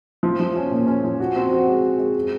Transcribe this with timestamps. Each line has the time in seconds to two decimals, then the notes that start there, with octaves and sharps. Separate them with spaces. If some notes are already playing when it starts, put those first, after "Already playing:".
0.23 F3
0.40 F3
0.56 C#4
0.71 A#2
0.87 C#4
1.04 F3
1.20 F#4
1.36 C4
1.51 F#4
1.68 G#3
1.83 F#4
1.99 G#3
2.15 G#3